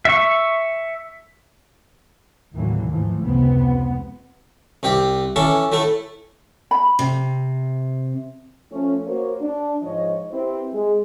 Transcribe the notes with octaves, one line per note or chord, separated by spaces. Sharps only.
E5 C#6
D#2 A2 D3 E3 F#3 A#3
G#2 E3 F3 A3
F1 C#2 C3 B3 C4
C2 C4 G4 D6
E3 C#4 A4 C#6 D6
A2 A3 E4 A4
B5
C3
F3 A3 C#4
A#3 F#4 C5 C#5
D4
G#2 F3 C#5 D#5
C4 E4 G4 B4 C5
G#3